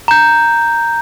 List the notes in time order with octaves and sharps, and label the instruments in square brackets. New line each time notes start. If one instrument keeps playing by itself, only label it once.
[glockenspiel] A#5 G6